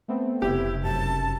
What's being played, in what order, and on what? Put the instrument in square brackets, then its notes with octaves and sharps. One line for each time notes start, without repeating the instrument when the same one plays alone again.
[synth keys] A3 B3 C4
[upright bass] F1 C#3 [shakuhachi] E4 [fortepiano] G4
[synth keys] F#2 C3 [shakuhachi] A5